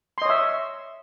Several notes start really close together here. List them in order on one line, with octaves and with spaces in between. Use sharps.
C6 D#5 C#5 E5